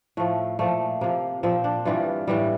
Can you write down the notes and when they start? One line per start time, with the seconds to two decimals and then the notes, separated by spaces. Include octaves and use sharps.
0.17 A2 F3 A3
0.59 A#2 F3 A3
1.01 C3 F3 A#3
1.43 A#2 F3 C4
1.64 D4
1.85 G2 E3 G3 F4
2.27 A2 E3 G3